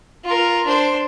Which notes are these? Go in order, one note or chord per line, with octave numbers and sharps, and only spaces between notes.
F4 A#4
D4 C5